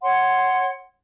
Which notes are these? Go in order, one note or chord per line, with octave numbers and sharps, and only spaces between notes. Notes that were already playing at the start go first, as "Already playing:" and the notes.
C#5 F#5 C6